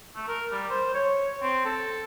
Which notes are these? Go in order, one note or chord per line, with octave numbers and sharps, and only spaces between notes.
A3
A#4
G3
C5
C#5
C4
A4